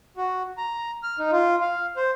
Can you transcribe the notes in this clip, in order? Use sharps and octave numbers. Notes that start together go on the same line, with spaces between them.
F#4
A#5
F6
D#4
F4
F5
C5